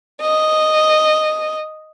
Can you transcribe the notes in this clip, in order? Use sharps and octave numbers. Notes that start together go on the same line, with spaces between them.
D#5